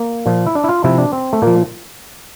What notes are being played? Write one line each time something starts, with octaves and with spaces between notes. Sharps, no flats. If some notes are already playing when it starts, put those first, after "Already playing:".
Already playing: A#3
A#2 F3
E4
D4
E4
F4
C3 F3 E4
D4
C4
A3
A#2 F3 A#3